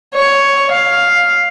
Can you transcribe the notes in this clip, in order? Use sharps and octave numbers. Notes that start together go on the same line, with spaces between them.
C#5
F5